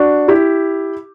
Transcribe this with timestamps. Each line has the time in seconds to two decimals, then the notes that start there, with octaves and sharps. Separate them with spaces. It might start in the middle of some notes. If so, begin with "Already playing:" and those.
Already playing: D4 F#4
0.28 E4 G4